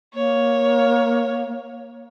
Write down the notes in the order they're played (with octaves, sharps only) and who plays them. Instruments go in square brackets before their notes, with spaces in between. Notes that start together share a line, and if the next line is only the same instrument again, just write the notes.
[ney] A#3 [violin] C#5